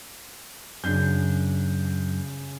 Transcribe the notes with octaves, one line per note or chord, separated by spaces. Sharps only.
F#2 C#3 D4 G6